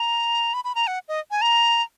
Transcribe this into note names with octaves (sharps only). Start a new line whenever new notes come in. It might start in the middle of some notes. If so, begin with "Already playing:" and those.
Already playing: A#5
B5
B5
A#5
F#5
D#5
G#5
A#5